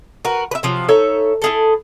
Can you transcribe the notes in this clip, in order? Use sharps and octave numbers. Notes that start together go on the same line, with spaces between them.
F#4 A#4 B4
B4 E5
C3 F3 F#3
D#4 A4 C#5 E5
E4 G#4 A4